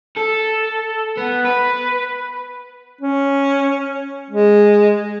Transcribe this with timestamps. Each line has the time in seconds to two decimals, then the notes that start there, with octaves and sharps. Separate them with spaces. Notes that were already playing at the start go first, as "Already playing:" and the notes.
0.17 A4
1.17 B3
1.45 B4
3.01 C#4
4.31 G#3